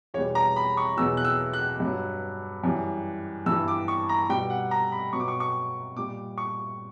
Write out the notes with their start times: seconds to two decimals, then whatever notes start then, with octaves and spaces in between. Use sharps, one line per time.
0.14 E2 C#5
0.17 B2 G3
0.35 A#5
0.56 B5
0.77 C#6
0.97 E2 B2 F#3 E6
1.17 F#6
1.25 E6
1.53 F#6
1.80 G2 F#3
2.63 F#2 E3 G3
3.46 G2 E3 G3 E6
3.68 D6
3.88 C#6
4.09 A#5
4.29 B2 G3 G5
4.50 F#5
4.71 A#5
4.92 B5
5.13 B2 F#3 C#6
5.20 D6
5.28 C#6
5.40 C#6
5.96 A#2 G3 D6
6.38 C#6